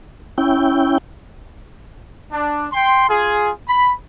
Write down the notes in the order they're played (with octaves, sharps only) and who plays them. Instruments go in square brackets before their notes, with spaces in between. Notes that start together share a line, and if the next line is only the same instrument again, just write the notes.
[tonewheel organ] C#4 E4 G5
[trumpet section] D4
G5 C6
F4 G#4
B5